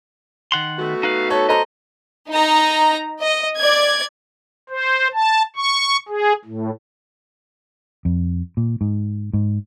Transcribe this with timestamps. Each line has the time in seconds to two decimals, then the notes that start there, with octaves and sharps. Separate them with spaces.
0.52 D#3 F#5 C6
0.78 A3 B3 F#4
1.03 D#4 B4 F5
1.30 A4 C#5
1.49 A4 C5 D#5 A#5
2.29 D#4 A#5
3.20 D#5
3.58 D5 G#6
4.70 C5
5.13 A5
5.56 C#6
6.09 G#4
6.45 A2
8.05 F2
8.57 A#2
8.81 G#2
9.33 G#2